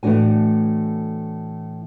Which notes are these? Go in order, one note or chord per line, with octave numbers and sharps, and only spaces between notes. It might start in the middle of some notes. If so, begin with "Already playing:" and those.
A2 E3 A3 D4 F#4 G#5